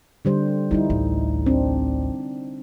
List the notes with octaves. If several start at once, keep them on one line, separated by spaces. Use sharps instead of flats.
D3 G3 C5
F3 G3 D#4 E4
A1 D2
C4 D4